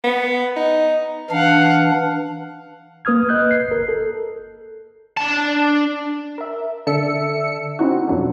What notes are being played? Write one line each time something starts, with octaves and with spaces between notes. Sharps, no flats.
B3
D#4
E3 D4 F5 F#5
A#3 B4 D#6 F6 G#6
B4 D#5 F#6 G6
C7
G1 A#4
A4
D4 A5
A#4 E5
D3 A4 D5 E5 E6 C#7
C4 C#4 D#4 E4 F#4
F2 B2 F#3 D4